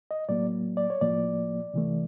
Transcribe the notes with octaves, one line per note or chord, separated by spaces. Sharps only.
D#5
A2 F#3 A#3 D5
D5
C#5
A2 F3 A#3 D5
C3 E3 A3